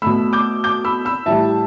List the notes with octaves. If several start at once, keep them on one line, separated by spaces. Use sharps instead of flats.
B2 A3 B5 E6
D6 G6
D6 G6
B5 E6
B5 E6
A2 E3 G3 E5 A5